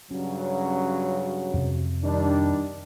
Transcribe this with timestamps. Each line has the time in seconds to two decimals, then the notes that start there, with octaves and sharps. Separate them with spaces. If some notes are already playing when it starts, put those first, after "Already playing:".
0.11 G2 C#3 F#3 C#4
1.54 F2 C3
2.03 D#3 G3 D4